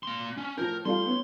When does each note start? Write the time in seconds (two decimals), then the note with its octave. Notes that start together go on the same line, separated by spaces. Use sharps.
0.03 A#3 C6
0.37 C#4
0.58 A2 F3 A#4 G6
0.85 G3 A3 F4 C6
1.05 B3 C#4